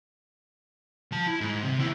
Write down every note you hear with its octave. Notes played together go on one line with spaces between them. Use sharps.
F3 A5
E4
G#2
C3
D#2 E4